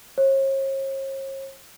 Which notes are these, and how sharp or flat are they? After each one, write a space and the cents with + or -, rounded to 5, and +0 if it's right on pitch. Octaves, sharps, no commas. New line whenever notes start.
C#5 -45